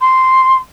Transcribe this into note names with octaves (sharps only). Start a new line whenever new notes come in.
C6